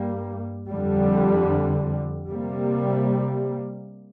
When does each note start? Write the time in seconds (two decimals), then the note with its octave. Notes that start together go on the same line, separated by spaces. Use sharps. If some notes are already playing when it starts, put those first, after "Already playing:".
Already playing: G2 G3 A#3
0.69 F2 D3 G3
2.27 C3 G3 A#3